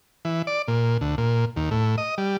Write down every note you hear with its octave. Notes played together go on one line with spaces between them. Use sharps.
E3
D5
A#2
D2
A#2
D#2
A2
D#5
G3